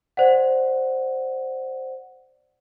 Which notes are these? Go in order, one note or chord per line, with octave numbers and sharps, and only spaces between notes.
C5 D5 F#5